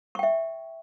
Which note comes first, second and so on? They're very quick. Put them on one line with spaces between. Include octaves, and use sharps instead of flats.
C#6 G5 E5